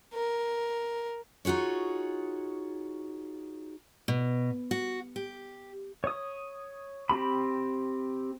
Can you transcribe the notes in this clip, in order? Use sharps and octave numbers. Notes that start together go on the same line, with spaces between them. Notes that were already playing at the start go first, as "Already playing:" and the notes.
A#4
D#4 F4 F#4 G#4 C#5
B2
F#4
G4
C#5 D#6
C4 G4 B5